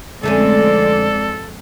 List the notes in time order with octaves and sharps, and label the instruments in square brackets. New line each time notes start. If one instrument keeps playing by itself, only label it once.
[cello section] F2 G#3 C4 [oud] D3 A3 C#4 [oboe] A4 [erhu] D5